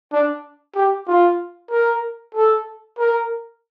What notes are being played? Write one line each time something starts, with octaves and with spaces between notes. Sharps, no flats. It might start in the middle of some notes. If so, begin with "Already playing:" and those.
D4
G4
F4
A#4
A4
A#4